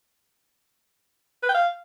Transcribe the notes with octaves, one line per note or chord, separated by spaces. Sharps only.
B4
G5
F5